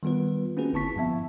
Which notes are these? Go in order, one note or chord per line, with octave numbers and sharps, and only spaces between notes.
D#3 G3 B3 F4 B4
A#3 C4 C#4 F#4 G#4 B4
G1 D3 E4 A5 C#6 B6
G2 F3 B3 E5 A5